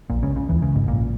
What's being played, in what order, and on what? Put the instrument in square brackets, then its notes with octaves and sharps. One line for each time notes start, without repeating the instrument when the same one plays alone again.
[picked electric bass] A#1 A#2
C#2 C#3
C#2 C#3
E2 E3
C#2 C#3
G#1 G#2
A#1 A#2